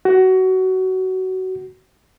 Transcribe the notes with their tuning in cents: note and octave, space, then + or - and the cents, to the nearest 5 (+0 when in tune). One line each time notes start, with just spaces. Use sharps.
F#4 +20